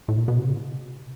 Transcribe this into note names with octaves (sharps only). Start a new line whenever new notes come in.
A2
A#2
B2
C3
C#3